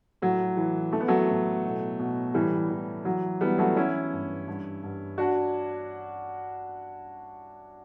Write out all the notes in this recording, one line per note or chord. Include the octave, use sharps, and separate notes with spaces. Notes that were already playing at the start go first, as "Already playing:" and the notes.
A2 F#3
E3
E3 A3
B3
F#3 A3
A2
B2
B2
A2 E3 G3
E3
E3 F#3
E3 G3 B3
F#3 A3
E3 C#4 E4
G2
G2
G2
D4 F#4